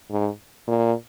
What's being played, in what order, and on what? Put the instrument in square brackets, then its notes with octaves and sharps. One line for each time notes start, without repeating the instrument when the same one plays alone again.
[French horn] G#2
A#2